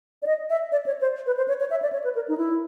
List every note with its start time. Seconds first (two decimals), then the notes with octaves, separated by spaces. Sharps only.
0.22 D5
0.26 D#5
0.50 E5
0.72 D5
0.86 C#5
1.01 C5
1.26 B4
1.37 C5
1.48 C#5
1.60 C#5
1.71 E5
1.82 D5
1.93 C#5
2.04 B4
2.15 A#4
2.28 D#4
2.38 E4